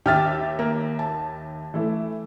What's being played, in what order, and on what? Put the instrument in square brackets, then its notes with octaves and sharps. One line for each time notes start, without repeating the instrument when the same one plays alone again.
[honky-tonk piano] D#2 E5 [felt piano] G4 F6 A6
[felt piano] A#3
A5
[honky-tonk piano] E3 A3 E4